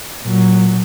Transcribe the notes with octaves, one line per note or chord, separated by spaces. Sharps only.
A#2 F#3